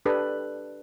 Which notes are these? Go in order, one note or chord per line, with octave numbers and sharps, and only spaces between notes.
D4 G4 A4 B4